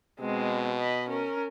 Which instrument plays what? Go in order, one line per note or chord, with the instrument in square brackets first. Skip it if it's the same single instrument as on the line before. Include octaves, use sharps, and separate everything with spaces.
[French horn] B2 [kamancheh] G#3 C4
[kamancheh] D#5 B5
C#4 A#4